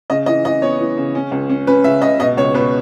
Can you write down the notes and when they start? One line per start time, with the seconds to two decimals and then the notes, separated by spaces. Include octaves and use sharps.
0.10 C#3 D#5
0.26 E3 D#5
0.44 E3 D#5
0.62 B3 C#5
0.79 E3
0.97 C#3
1.15 C#4
1.32 C#2
1.50 C#4
1.67 C#4 B4
1.84 C#3 E5
2.02 C#2 D#5
2.20 B2 D#5
2.37 C#2 C#5
2.54 B2 B4